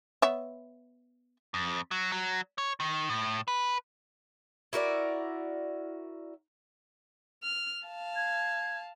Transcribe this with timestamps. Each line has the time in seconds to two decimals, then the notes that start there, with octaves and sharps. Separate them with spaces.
0.22 B3 C#5 E5
1.54 F2
1.91 F#3
2.12 F#3
2.58 C#5
2.80 D#3
3.09 A2
3.48 B4
4.73 E4 F#4 A#4 D5
7.43 F6
7.85 F5 A5
8.16 G#6